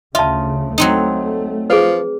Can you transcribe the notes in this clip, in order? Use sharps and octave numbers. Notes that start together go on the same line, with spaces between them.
D2 C#3 F4 E5 A5
F#3 A3 C4 D#4
F3 G#4 B4